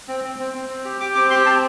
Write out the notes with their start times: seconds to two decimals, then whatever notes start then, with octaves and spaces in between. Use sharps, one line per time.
0.08 C4
0.24 C4
0.39 C4
0.54 C4
0.69 C4
0.85 G4
1.00 G4 D6
1.15 C4 D6
1.30 G4 C6
1.46 C4 A5